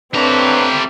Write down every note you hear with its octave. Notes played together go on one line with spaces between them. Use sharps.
G3 A3 A#3 C4 D4 B4 C#5 A#5